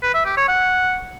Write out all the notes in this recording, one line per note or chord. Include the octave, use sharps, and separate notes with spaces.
B4
E5
G4
C#5
F#5